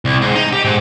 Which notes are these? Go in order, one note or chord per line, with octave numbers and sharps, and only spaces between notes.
C2
G#2
D#4
G4
G#2